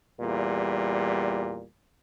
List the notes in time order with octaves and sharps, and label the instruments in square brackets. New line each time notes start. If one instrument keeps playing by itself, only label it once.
[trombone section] E2 A#2 G3